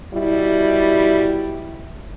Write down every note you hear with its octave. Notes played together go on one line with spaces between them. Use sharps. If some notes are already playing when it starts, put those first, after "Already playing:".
B2 G3 E4